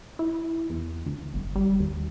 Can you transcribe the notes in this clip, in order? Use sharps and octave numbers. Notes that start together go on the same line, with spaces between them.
E4
E2
D2
G1
G3
D#2